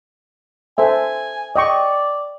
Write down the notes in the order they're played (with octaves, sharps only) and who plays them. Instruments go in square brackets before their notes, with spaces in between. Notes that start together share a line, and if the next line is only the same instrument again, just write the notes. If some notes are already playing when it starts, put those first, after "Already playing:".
[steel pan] A4 C5 E5 [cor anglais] G#5
[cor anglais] D5 [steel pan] D#5 G5 C#6